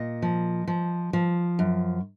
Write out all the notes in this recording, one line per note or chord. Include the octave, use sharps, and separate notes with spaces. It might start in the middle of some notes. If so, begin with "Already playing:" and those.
Already playing: A#2 D#5
F3
F3
F3
F#2